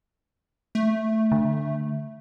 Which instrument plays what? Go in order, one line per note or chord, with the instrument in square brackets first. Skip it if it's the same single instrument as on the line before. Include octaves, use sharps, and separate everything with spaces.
[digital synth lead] A3
[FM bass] D3